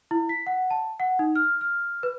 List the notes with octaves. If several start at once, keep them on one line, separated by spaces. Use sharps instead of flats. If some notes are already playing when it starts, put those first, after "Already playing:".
E4
B6
F#5
A5
F#5
D#4
F6
F6
B4